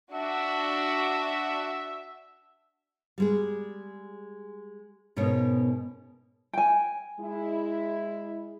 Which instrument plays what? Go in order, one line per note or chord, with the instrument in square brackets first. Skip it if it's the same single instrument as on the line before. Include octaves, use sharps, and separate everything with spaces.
[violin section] D4 F#4 [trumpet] E5
[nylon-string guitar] G3 G#3 G#4
G#2 B2 C#4 A#4 C#5
[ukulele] G5 G#5
[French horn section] G#3 E4